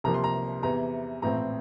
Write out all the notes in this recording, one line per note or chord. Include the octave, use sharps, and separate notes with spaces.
C2 C3 F3 A#3 A#5
C6
A#5
E2 C3 E3 A#5
A#1 A2 E3 A3 C4 A#5